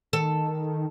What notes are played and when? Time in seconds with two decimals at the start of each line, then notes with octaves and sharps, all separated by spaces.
0.13 D#3 A4